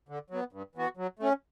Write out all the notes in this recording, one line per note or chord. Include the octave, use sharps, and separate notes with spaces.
D3
F#3 B3
G2
E3 B3 F#4
F#3
A3 C#4